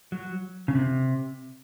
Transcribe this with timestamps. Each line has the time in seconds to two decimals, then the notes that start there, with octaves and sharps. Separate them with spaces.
0.12 F#3
0.68 C#3
0.75 C3